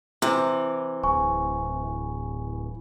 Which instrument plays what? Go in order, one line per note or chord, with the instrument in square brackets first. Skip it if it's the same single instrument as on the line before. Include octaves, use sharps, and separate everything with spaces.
[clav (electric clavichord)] C3 [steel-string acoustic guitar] E3
[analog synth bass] D1 [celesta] G#5 C#6